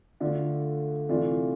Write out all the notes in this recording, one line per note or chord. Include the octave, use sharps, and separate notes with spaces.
D3 A3 D4 F4
C3 E3 A3 D4 F4